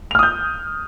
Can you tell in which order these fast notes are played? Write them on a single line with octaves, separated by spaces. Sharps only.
F7 F6 D#6 G6